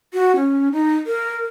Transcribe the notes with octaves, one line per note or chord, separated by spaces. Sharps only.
F#4
C#4
D#4
A#4